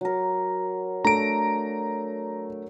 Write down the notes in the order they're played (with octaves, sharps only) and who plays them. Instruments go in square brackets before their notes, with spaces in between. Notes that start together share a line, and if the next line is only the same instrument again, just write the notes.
[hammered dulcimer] F#3 A#4
[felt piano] A3 D4 A4 [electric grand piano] A#5 D7